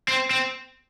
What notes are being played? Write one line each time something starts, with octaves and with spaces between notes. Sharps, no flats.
C4
C4